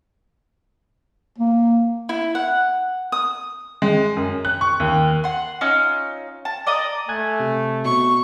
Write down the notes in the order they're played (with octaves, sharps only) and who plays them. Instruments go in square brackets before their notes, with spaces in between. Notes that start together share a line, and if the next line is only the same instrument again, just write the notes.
[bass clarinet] A#3
[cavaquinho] E4
F#5
D#6
[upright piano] G#3
F#2
F#6
C#6
D#2
[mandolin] F#5 C6
C#4 D#4 F4 E6
A5
D5 D#5 A#5 D#6
[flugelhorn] A3 [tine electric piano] G#5 F#6 G#6
[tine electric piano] C3
[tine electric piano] B2 [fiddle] C#6